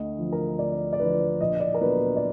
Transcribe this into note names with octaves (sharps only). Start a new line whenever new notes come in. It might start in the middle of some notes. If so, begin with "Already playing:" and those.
Already playing: D2 D#5
D3 F3
A#4
D2 D5
D5
D3 F3 B4
A#1 D#5
D#5
D5
A#4
A#2 F#3 B3 D4 B4
D5